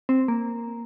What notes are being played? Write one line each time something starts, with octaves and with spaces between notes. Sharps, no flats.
C4
A#3